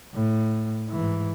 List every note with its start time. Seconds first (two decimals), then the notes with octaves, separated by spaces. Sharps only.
0.14 A2
0.89 G#2 E3